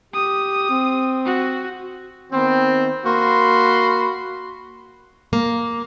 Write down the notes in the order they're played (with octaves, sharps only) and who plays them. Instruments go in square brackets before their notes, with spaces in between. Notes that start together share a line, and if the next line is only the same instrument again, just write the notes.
[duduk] G4 [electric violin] D#6
[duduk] C4
[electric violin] F#4
[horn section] D#3 B3 C4
A#3 F#4 B5 C6
[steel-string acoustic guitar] A#3